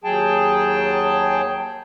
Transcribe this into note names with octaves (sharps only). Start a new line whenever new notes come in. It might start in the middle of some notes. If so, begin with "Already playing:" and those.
D#2 F#3 G#4 G5 A5